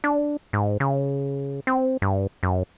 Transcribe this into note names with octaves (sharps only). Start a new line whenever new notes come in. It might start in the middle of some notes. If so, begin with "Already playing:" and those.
D4
G#2
C#3
C4
G2
F#2